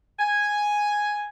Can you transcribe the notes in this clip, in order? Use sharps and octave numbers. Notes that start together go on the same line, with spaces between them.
G#5